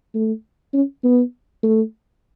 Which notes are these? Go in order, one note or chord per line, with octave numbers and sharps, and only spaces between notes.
A3
C#4
B3
A3